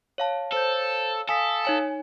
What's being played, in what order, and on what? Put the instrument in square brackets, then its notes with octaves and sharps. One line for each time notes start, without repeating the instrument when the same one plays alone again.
[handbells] C#5 F5 A5
[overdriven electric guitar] A4 [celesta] C5 G6
[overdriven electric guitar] A4 [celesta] F5 D#6 B6 [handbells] G#5
[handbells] D#4 C#5 G#5